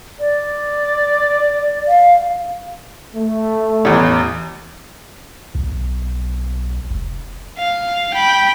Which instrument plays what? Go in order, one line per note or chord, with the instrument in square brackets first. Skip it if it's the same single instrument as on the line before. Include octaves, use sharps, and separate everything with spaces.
[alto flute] D5
[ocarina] F5
[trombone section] A3
[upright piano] A1 E2
[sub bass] B1
F1
[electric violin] F5
G5 B5